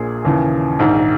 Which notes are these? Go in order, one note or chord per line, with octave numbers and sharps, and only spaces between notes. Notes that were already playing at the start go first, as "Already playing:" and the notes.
Already playing: A#1 A#2 G#4
D#2 C#3 E3
A#1 G#2 D#3